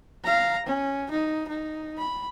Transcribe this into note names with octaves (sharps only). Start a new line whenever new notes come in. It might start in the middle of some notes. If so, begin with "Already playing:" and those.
F5 A#5
C#4
D#4
D#4
B5